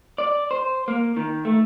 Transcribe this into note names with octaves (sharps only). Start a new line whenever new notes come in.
D5
C5
A#3
D#3
A3